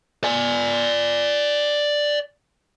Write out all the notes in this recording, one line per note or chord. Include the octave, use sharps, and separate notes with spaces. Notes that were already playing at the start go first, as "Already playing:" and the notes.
D5 G#5